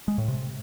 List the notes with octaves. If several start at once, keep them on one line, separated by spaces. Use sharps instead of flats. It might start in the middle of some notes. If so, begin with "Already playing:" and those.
G#3
A2
C3